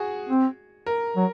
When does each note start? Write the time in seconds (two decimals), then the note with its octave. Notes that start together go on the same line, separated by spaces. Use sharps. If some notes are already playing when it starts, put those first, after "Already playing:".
Already playing: F#4 G#4
0.29 C4
0.86 A#4
1.17 F#3